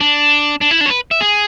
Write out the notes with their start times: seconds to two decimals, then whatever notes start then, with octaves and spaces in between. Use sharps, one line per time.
0.01 D4
0.61 D4
0.71 E4
0.81 D4
0.86 C#5
0.90 B4
1.11 E5
1.21 G#4